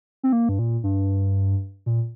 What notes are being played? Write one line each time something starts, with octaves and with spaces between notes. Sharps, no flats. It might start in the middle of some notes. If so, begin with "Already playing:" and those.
C4
A#3
G2
A#2
G2
A#2